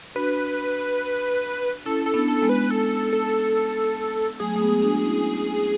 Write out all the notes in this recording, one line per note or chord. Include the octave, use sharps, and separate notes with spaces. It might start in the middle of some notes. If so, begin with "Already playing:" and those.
D4 F#4 B4
C#4 E4 A4
A4
B3 D4
A4
G#3 B3
B4
A4
A4
F#3 A3 G#4
A3
G#3 B3
D4 F#4
C#4 E4